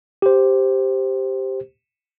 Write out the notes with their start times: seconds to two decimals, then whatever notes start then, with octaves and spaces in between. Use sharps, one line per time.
0.22 G4 C5